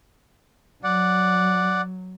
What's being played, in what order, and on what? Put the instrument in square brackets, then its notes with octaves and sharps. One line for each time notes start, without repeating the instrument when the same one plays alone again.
[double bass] F#3 [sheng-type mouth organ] D5 F#5